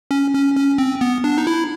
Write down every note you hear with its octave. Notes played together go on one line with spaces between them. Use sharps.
C#4
C#4
C#4
C4
B3
D4
D#4
E4